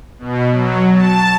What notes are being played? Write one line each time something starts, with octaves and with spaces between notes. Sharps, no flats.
B2
F#3
A5